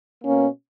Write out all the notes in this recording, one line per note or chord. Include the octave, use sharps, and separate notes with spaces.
B2 A#3 C#4